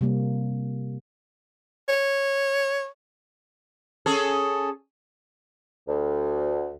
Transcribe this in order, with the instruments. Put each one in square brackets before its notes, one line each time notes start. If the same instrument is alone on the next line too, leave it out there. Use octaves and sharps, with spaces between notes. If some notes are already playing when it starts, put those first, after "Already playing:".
[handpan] C3 G3 A#3
[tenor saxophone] C#5
[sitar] C#4 G#4 A4
[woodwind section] D2